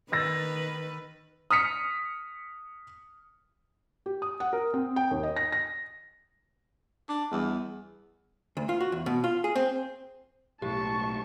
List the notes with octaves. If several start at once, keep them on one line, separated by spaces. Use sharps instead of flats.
D#3 B4 E6 A6 A#6
D#6 F6 B6 C#7
G4
D#6
F#5
A#4
C4
G5
D#2
D#5
A#6
A#6
D4 D6
E2 G3 G#4
D2
F4
F#4
E2
B2
F4
G#4
C4
B1 A2 G4 A5 C#6